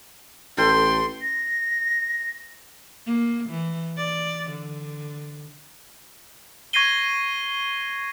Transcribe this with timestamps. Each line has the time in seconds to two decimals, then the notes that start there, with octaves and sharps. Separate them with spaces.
0.57 A1 A4 G5 C6
1.22 A#6
3.05 A#3
3.49 E3
3.96 D5
4.50 D3
6.73 C#6 G#6 A#6 C7 D#7 G7